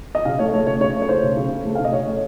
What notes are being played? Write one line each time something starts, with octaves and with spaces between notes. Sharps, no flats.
D#5
C#3 F5
A3 C#5
A3 C#5
C#3 C#5
C#3 C#5
A3
C#5
A3 C5
C#3
C#3
A3
A3
C#3 F5
D#5
C#3 C#5
A3